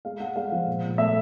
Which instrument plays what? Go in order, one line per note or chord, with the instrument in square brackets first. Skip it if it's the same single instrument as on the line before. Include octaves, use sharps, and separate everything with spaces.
[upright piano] G#3 F5
G#3 F#5
G#3 F5
F3
A#2
A#2
A3 E5